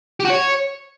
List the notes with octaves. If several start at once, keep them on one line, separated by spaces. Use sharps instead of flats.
G4
F#4
C#5